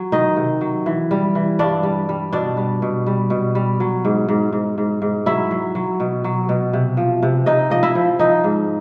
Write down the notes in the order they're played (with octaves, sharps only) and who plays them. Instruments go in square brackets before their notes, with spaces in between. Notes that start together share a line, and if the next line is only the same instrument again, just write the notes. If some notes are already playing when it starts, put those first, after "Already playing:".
Already playing: [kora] F#3
D#3 D#4 D#5
C3
F#3
E3
G3
E3
G2 D4 D5
G3
G3
B2 D4 D5
G3
B2
G3
B2
G3
F#3
G#2
G#2
G#2
G#2
G#2
F#3 E4 E5
F#3
F#3
B2
F#3
B2
C3
F3
C3
C3 D#4 D#5
F3 D#5
E4 E5
F3
F3 D#4 D#5
G#2